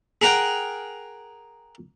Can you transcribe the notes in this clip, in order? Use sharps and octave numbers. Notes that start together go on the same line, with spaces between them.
G#4 A#4 F#5 G5